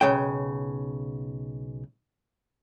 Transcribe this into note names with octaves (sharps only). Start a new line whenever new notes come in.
B1 C#3 G5